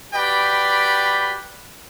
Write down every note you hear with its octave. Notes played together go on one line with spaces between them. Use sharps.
F#4 G4 B4 D5 G5 B5